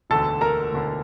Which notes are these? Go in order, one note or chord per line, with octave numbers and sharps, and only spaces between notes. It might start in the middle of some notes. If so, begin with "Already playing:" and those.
E1 D2 D3 A4 A5
A#4 A#5
E1 D2 D3